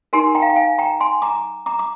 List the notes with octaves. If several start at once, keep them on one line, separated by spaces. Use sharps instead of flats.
D#4 G4 A#4 G#5 C6
G5 A#5
F5
G5
F5 G#5
G5 A#5
G#5 C6
A#5 D6
A#5 D6
D6